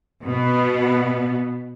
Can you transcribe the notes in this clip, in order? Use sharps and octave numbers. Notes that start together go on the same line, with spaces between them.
B2 B3